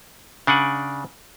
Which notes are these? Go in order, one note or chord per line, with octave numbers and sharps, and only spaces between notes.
C#3 D4 D5 F#5 G#5